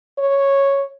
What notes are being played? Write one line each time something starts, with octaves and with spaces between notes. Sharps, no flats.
C#5